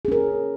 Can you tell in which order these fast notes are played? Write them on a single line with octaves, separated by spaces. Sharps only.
G#4 C#4 A#4